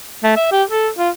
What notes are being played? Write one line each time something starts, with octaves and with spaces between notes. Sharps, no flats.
A3
E5
G4
A4
F4